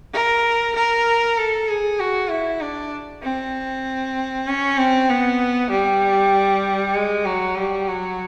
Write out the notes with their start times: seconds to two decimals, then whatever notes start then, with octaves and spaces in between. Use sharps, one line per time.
0.14 A#4
0.75 A#4
1.38 A4
1.69 G#4
2.00 F#4
2.30 E4
2.61 D4
3.23 C4
4.48 C#4
4.78 C4
5.10 B3
5.70 G3
6.94 G#3
7.26 F#3
7.56 G3
7.88 F#3